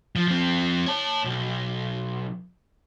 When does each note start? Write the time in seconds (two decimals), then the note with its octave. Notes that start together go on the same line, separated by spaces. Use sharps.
0.16 F3
0.28 F3 C4
0.86 C#5 A5
1.25 B1